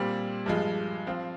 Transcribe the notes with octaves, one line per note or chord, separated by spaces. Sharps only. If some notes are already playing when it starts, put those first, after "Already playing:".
Already playing: A#2 G3 C4
G2 F3 G#3
F3 C4 F4